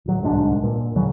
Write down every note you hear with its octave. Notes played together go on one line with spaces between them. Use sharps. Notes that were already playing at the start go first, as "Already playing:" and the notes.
D1 F#3
D1 C2 G#2 D4
A#2
D#2 C#3 F#3